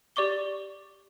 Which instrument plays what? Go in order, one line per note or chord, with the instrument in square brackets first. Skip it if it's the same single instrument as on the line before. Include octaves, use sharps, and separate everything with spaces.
[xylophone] G4 D5 C#6 D6 G7